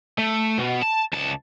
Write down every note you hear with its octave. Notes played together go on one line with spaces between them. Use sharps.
A3
B2
A5
C#2 A5